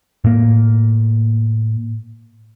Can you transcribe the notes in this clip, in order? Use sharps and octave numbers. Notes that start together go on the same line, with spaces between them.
A2 A#3